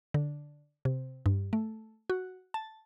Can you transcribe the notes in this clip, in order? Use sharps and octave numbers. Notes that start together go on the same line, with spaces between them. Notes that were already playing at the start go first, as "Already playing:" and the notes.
D3
C3
G2
A3
F#4
A5